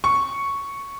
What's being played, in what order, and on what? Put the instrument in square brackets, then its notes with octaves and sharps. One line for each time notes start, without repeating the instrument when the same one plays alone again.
[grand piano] C#6